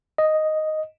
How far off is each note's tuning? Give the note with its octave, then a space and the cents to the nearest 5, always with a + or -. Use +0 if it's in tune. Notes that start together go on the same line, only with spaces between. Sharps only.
D#5 +0